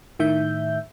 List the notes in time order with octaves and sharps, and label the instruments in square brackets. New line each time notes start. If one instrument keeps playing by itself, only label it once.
[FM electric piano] A2 D#3 E5 G6